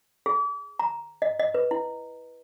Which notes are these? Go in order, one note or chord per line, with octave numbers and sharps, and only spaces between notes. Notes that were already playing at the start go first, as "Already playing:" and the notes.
G#4
A#5
D#5
D#5
B4
E4